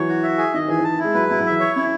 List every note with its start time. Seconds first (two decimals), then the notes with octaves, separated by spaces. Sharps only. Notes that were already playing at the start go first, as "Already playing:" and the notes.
Already playing: E3 F#3 C#5
0.09 F#4
0.23 E5
0.38 G#4
0.54 D#3 D#5
0.68 E3 G#4
0.79 E3
0.84 A5
0.99 E4
1.04 G#3
1.14 F#3 B4
1.29 F#3 E4
1.40 F#3
1.46 E3 E5
1.60 C#5
1.76 C#4 E4